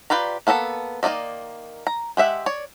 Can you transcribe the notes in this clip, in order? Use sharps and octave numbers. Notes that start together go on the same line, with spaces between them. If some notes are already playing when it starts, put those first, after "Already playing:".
F4 G4 B4 D5 A#5
A#3 B3 A4 D#5 A5
D#3 A#3 D#4 D5 D#5
A#5
G#3 G4 E5 F#5
C#5 D5